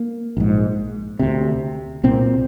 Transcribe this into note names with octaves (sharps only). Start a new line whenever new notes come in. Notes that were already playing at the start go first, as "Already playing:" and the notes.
Already playing: A#3
A#1 G#2
D2 C3
C2 A#2 C4